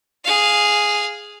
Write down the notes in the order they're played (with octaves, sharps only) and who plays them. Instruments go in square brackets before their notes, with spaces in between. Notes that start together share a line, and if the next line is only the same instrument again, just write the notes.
[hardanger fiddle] G#4 F5